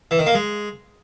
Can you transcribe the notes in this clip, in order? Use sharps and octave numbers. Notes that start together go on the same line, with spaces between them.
E3
D#3
A#3
G#3